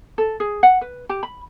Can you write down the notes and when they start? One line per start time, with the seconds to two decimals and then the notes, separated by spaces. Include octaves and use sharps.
0.18 A4
0.40 G#4
0.63 F#5
0.81 B4
1.09 G4
1.23 B5